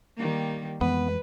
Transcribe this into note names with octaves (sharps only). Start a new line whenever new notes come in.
D#3 G3 A#3
F2 E3 G#3 B3 B4